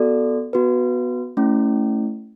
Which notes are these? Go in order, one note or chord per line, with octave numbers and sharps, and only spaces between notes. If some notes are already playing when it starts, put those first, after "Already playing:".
Already playing: B3 F#4 A4 D5
B3 F#4 B4
A3 C#4 E4